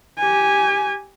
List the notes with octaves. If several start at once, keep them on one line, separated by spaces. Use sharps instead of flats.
G4 G#5